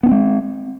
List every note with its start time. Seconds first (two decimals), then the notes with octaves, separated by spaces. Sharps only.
0.03 B3
0.06 D4
0.09 C4
0.11 G#3